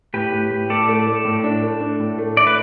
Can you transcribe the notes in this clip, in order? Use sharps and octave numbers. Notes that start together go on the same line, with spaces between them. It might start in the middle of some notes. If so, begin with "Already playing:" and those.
A2 G4 B4
A2
A2
A2 A4 D5
A3
A3
A2
D4
A3
D4
A2
A3
E4 D5
B4